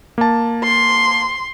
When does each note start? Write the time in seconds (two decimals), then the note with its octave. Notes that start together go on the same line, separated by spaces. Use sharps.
0.18 A#3 A5
0.64 C6